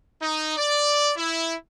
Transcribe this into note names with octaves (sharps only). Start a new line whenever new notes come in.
D#4
D5
E4